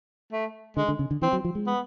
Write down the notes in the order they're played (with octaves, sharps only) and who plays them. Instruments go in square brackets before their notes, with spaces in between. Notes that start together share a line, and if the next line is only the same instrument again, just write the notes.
[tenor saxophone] A3
[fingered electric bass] D3 [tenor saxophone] G#3
[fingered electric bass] D3
C#3
D3
[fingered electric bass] E3 [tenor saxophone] C4
[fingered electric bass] F#3
F3
G#3
[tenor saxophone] B3